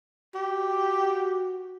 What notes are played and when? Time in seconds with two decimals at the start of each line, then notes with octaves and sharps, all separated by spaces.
0.35 F#4 G4